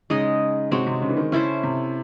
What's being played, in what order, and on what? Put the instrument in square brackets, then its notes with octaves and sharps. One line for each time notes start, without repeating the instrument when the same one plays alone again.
[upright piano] C#3 [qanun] G#3 D#4 G#4 D#5
[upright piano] C3 [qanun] G#3 C4 F#4 C#5
[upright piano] C3
C#3
E3
D#3
[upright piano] C#3 [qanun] C#4 E4 A4 C5
[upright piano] C3